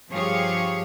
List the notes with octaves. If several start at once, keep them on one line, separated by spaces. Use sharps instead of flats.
G2 F3 G4 G#4 C#5 F5